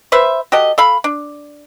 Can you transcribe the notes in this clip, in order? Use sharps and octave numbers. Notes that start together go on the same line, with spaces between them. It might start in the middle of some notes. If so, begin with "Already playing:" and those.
B4 C5 E5
F#4 G4 A4 D#5
A4 F5 B5
D4